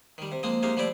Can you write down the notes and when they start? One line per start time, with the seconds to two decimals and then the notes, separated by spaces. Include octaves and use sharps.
0.18 D#3 G3
0.32 C3
0.43 F3 G#3 A#3 C4 D#6
0.63 C3 G#3 A#3 D#4 F5
0.77 F3 G3 A3 E4 D5 D6